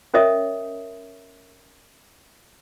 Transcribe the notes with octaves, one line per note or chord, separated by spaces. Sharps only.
C#4 A#4 C#5 D#5 E5 D#6